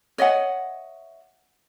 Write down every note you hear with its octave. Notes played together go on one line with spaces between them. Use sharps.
C#5 D#5 E5 F#5